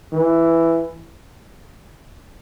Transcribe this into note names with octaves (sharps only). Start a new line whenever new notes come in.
E3